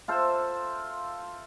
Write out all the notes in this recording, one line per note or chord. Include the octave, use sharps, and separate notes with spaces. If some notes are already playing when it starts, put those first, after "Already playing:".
F4 A4 C5 E5